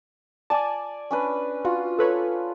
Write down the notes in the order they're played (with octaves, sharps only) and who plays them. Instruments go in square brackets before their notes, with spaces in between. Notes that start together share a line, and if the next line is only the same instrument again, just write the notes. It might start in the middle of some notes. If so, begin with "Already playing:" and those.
[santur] D5 G#5 [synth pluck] A5 D6
[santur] C#4 D4 B4
[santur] F4 [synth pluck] F#4
[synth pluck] A4 B4 C#5